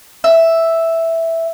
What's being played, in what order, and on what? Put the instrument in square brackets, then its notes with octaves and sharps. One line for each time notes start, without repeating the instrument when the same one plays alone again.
[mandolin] E5